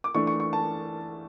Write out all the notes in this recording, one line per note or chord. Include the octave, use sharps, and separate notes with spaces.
D6
E3 A3 D4 C#6
C#6
C#6
A5